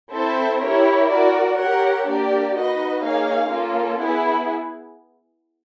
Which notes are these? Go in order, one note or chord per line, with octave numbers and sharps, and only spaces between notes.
C4 E4 A4 C5 E5
E4 G4 A#4 C#5
F#4 A#4 D5
G4 A#4 C#5 F#5
A#3 D4 G4 A#4 D5
D#4 F#4 B4 D#5
A#3 D#4 G#4 C#5 F5
A#3 C#4 F4 A4
B3 E4 G#4